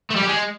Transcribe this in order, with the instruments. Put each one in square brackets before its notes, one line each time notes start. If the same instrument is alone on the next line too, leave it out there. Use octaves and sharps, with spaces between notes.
[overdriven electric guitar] A3
G3
G4
G#3